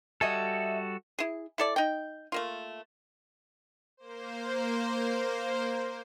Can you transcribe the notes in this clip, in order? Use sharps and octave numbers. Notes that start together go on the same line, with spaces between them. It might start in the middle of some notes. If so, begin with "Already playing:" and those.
G3 F#4 A4 D#5 E5 G#5
E4 G#4
E4 A4 D5
D#4 G5
A3 A#3 F4
A#3 C5